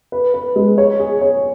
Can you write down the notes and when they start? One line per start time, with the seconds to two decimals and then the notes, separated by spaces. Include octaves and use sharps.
0.12 B4
0.34 B4
0.56 G#3
0.78 C#5
1.00 G#4
1.21 C#5